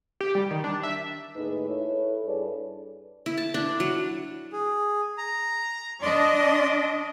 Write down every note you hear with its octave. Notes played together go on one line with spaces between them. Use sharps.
G4
G3
D#3
D4
E5
D#2 A2 D#4 G#4 B4
E4 A4 B4 C#5
G2 G#4 A4 B4 C#5 D5
E4
A5
D4
F#3
G#4
A#5
D4 D5 D#5 C6